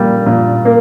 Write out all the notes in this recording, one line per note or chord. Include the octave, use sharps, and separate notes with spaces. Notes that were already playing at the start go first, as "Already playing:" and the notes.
Already playing: A#2 G3 A#3
A#2
A#3